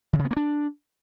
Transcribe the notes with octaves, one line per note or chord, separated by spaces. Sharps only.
D#3
C#3
B3
A#3
D4